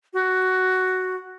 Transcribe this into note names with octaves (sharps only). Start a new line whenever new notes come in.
F#4